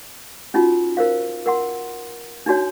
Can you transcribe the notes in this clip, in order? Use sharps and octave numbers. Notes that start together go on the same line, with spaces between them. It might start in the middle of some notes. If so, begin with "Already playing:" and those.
C#4 D#4 F4 F#4
A#4 C5 F5
A#4 F#5 C6
D4 D#4 F#4 C#5